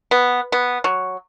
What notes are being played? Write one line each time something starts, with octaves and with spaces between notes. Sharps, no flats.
B3
B3
F#3